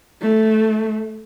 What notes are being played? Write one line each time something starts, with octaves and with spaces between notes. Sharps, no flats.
A3